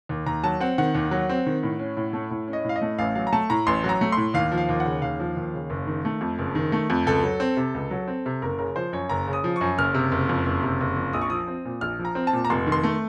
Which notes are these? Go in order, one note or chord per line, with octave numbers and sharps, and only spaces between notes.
D#2
D#2 A#5
F#3 A5
C4 F#5
D#3 F#5
D#2
F#3
C4
D#3
A2
C#4
A2
A3
A2
C#4
D#5
A2 F5
D#5
A3
A1 F5
F#3 F5
A#5
A3 A5
A2 A#5
A1 C6
F#3
A#5
A3
A2 C6
D#2 F5
F3
F5
D#2
F#5
C#3
D#2 F5
F3
D#2
C#3
F#1
D#3
A3
F2
F#1
D#3
A3
F2
C#2 A4
F#3
C4
C3
C#2
F#3
C4
C3
F#1 A#4
C#3 A#4
F3 C5
F#2 C#5
F#1 A#5
C#3
D#6
F3
F#2 C#6
F#1 F6
C3
F#1
F2
F#1
C3
F#1
F2
A#1 D#6
C#6
F3 D#6
C4
A#2
A#1 F6
F3
A#5
C4
A5
A#2
A#5
F1 C6
D#3
C6
A3